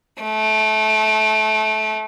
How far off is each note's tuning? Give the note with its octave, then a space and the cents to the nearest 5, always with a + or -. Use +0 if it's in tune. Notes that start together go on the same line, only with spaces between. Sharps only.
A3 -25